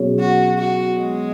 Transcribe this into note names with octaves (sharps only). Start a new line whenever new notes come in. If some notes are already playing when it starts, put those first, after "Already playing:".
Already playing: B2 F#3 C#4 G#4 C#5
F#4
F#4
G#3